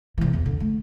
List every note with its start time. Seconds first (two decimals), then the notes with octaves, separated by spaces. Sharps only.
0.18 C2 E3
0.33 E2
0.46 D3
0.60 A3